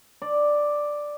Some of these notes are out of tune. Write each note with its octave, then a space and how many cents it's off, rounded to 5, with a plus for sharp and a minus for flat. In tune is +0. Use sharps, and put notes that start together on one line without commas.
D5 +5